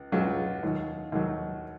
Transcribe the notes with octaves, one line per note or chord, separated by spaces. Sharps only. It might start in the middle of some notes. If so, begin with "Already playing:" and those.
Already playing: C#2
C#2 C#3 F#3 F4
D#2 D#3 F#3
D#2 D#3 F#3